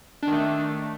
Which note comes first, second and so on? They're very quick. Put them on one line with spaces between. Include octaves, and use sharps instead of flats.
D4 D#3 A3